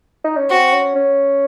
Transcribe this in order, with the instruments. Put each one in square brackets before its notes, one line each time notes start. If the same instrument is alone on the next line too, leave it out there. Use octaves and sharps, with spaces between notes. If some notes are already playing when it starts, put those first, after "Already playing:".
[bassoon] D#4
C#4
[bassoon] C4 [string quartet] F#4
[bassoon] C#4
C#4